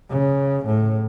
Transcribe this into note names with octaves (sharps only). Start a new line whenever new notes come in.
C#3
A2